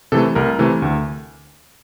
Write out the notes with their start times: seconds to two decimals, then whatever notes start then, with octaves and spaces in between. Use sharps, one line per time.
0.12 C3 E3 A3 A4
0.35 C2 A#4
0.59 C3 E3 A3
0.82 D2